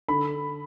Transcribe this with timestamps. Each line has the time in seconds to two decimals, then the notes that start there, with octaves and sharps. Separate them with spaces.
0.08 D3 B5